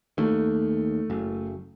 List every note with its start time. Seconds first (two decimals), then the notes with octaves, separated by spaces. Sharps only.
0.18 D#2 A3
1.10 F#1